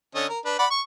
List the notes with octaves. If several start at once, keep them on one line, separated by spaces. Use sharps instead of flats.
D3 C#4 D#5
A#4
D4 B4
D5 F#5 B5
C#6